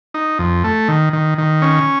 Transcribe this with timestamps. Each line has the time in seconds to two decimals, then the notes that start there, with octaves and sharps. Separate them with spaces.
0.14 D#4
0.39 F2
0.64 A3
0.88 D#3
1.13 D#3
1.38 D#3
1.62 C#4